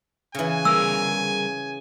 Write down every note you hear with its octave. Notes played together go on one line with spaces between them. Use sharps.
C#3 E3 G#5
G3 G#4 A#4 E6